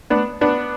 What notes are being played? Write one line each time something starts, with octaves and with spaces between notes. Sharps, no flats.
B3 D4
B3 D4